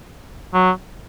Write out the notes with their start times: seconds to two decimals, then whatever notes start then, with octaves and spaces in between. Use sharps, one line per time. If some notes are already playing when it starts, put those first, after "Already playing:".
0.53 F#3